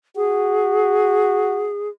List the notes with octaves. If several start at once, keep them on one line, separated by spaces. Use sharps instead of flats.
F#4 G#4